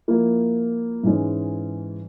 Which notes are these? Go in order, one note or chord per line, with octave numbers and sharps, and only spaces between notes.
F3 A#3 E4
G#2 E3 G#3 C#4